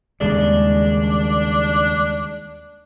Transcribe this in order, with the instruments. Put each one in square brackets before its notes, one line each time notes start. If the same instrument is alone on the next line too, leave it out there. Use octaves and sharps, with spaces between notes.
[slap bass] D#2 C#3 G3 [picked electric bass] G#3 [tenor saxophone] D4